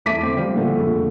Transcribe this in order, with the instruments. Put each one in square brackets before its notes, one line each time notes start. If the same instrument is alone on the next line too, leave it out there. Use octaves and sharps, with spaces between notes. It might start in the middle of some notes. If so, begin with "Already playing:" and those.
[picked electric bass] E2 A3 [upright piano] D6 B6 D#7
[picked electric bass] D3 C4
F3 G3
[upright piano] A#2 D3 A3
[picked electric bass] F2 C#3